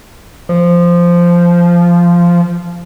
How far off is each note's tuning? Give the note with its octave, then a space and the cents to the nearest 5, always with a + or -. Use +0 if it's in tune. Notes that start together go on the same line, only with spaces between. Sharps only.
F3 -10